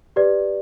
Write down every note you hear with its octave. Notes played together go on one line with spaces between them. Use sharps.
G4 B4 D5